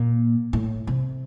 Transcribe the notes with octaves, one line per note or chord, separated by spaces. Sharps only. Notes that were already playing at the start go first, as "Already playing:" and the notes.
Already playing: A#2
A2
C3